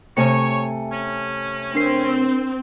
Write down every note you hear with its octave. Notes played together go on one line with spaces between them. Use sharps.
C3 A3 C#5 G#5 C#7
C#4
C4 D4 A#4 C7